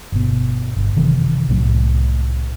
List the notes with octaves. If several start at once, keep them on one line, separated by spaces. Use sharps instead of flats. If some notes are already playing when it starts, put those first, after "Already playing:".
G1 B2
G1
F#1 C3 D#3 E3
C2 A2 F#3